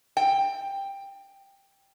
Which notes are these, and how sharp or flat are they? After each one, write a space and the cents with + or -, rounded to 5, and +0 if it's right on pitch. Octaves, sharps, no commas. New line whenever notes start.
G5 +10